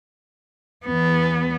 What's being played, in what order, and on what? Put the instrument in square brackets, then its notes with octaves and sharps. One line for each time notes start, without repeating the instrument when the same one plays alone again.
[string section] E2 [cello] B3